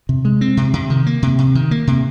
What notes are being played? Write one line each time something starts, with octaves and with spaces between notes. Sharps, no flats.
C3
G#3
C4
C3
C3
D#3
A#3
C3
C3
D#3
A#3
C3